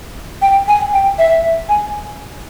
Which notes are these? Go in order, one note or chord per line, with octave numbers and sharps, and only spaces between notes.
G5
G#5
G5
E5
G#5